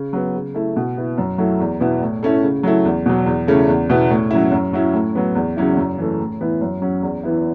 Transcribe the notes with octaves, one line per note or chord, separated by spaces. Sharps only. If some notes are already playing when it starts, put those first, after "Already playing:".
Already playing: C#3
F#3 B3
C#3
A3 E4
B2
B3 E4
F#2
F#3 A3 E4
E2
B2 B3 E4
A2
A3 C#4 E4
C#3
F#3 A3 E4
E2
B2 F#3
E2
C#3 A3 C#4 E4
E2
B2 B3 E4
A2
F#3 C#4 E4
F#2
F#3 C#4 E4
A2
F#3 B3
E2
C#3 F#3 C#4 E4
F#2
E3 A3
A2
E3 B3 E4
F#2
F#3 C#4
E2
E3 B3 E4